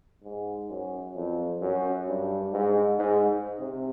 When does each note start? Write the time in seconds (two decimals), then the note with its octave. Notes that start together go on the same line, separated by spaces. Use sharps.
0.24 G#2
0.70 F#2
1.16 F2
1.61 F#2
2.07 G2
2.53 G#2
2.99 G#2
3.60 C3